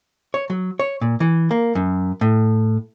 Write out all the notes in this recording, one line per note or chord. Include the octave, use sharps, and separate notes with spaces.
C#5
F#3
C#5
A#2
E3
A#3
F#2
A2